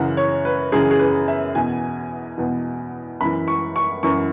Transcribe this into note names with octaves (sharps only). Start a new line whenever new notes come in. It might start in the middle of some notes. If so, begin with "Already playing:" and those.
Already playing: F#2 C#3 E3 F#5
C#5
B4
F#2 C#3 E3 G#4
G#4
B4
E5
E2 B2 G#5
E2 B2
F#2 E3 B5
C#6
C#6
F#2 E3 C#6